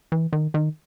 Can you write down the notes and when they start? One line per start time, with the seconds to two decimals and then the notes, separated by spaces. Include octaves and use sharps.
0.12 E3
0.33 D#3
0.54 D#3